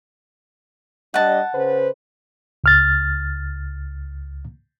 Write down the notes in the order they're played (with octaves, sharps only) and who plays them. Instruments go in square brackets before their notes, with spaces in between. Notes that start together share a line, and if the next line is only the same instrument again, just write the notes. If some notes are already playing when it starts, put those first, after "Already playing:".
[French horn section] G3 D4 D#5 [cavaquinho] F#5 A5
[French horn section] C#3 B4 C5
[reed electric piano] C#2 F6 A6